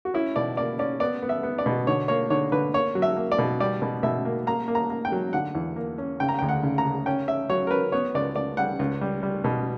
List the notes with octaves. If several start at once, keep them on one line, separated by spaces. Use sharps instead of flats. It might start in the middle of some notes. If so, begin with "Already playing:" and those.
F#4
C#4 E4
B2 D5
A#3 D5
C#4 D5
B3 D5
B3
E5
B3
D5
B2
D3 C#5
A#3 C#5
D3 C#5
D3 B4
A#3 C#5
F#3
E5
A#3
D5
B2
G3 D5
B2
B2 E5
A#3
A#3 A#5
A#3
A#5
A#3
G5
F#3
D3 F#5
E2
A#3
C#4
C#3 G5
A#5
G5
D2
F#5
C#3
A#5
C#3
C#4 G5
C#4 E5
F#3 C#5
A#4
C#4 B4
B3 C#5
C#2 D5
C#2 D5
G3 F#5
C#2
G3
G3
B2